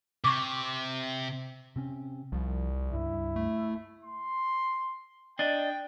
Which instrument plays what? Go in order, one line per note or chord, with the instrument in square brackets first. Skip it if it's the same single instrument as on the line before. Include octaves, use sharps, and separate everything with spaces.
[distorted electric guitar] C3 [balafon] C#6 D6
[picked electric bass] C3 C4 C#4
[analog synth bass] C2 [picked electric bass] F3
[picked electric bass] C#2 G2 [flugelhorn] E4
[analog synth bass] A3
[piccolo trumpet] C6
[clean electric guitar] D4 D#5 [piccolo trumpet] G5